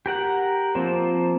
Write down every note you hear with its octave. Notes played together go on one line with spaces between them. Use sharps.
G4 A#4 F#5
F3 A#3 C4